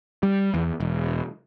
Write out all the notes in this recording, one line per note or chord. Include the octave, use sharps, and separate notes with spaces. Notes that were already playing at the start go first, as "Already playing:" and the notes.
G3
E2
E1